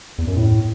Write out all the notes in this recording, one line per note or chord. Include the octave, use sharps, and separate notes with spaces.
E2
F#2
A2